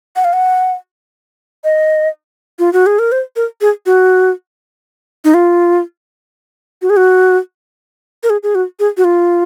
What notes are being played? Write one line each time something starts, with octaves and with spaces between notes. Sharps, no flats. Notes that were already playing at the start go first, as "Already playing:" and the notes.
F#5
F5
F#5
D#5
F4
F#4
G#4
A#4
C5
A#4
G#4
F#4
D#4
F4
F#4
G#4
F#4
A#4
G#4
G#4
F#4
G#4
F#4
F4